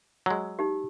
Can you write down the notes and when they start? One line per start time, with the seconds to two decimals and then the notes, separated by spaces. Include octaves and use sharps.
0.26 F#3 G#3 E6
0.59 D#4 G4